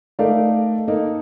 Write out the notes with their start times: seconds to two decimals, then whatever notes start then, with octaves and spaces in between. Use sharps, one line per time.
0.19 A3 D#4 A#4 D5 F5
0.88 A#3 D#4 A4